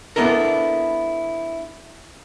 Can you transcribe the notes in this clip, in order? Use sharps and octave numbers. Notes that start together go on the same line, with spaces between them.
B3 D4 E4 A4 A#4